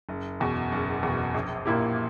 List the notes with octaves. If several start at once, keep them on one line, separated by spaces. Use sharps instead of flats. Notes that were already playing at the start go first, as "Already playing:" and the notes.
F#1
E2 B2
F#1
E2 B2
A#1
A#2 A#3 E4 G4